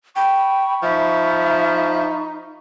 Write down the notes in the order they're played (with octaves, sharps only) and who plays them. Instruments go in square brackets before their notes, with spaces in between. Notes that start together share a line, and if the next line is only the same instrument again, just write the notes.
[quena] G5 [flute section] B5 C#6
[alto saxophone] F3 [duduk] D#4 [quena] E5